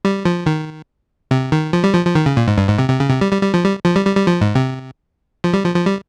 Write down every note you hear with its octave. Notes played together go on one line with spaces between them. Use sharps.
G3
F3
D#3
C3
D#3
F3
G3
F3
F3
D#3
C#3
A#2
G#2
G2
G#2
C3
C3
C#3
C3
G3
G3
G3
F3
G3
F3
G3
G3
G3
F3
G#2
C3
F3
G3
F3
F3
G3